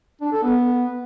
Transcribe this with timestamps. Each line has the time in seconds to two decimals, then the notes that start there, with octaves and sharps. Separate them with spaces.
0.21 D4
0.32 A4
0.43 B3